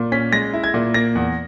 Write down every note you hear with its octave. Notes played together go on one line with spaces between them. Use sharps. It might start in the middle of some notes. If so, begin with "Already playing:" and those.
Already playing: A#2
C#4 B6
G#3 A#6
E4
G#6
A#2
A#3 A#6
E2